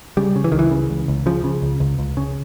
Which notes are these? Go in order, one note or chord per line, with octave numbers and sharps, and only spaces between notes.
C#3 G3
C#3
E3
C#2 D#3
E3
C#3
C#2
C#2
C#3 F3
C#3
C#2
C#2
C#2
C#3